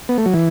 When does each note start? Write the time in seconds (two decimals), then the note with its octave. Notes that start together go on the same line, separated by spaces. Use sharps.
0.09 B3
0.18 A3
0.26 F#3
0.33 E3